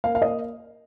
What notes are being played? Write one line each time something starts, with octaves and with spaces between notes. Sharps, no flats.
A#3 F5
F5
A#3 D#5